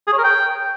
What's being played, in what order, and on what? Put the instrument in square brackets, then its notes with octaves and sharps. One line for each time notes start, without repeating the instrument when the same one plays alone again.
[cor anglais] G#4
C#5
A#4
G5